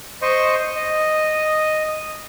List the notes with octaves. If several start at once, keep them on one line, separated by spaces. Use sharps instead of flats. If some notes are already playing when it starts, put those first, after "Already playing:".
C5 D#5 C#6
D#5